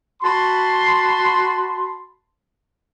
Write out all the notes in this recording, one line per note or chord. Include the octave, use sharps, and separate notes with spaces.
F#4 A5 B5 C6